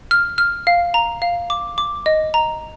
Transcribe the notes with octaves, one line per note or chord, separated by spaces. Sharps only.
F6
F6
F5
A#5
F5
D6
D6
D#5
A#5